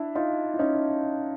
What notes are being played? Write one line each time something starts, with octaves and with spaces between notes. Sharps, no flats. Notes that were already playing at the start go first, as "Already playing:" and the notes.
Already playing: D4 E4
D#4 F4
E4
C#4 D#4